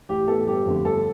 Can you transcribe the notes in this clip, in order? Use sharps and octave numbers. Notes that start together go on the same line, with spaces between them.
A1 G4
A2 E3 B3 A4
G1 G4
F2 D3 A3
G1 A4